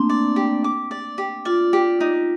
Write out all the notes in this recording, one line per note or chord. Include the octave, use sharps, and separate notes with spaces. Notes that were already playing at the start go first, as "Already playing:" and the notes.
Already playing: A3 A#3 C4 D4 C6
D5
G4
D6
D5
G4
F4 D5
G4
D#4